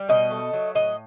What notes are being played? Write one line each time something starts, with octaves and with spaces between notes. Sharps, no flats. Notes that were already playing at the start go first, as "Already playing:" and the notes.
Already playing: G3
B2 D#5
A3
F#3
A2 D#5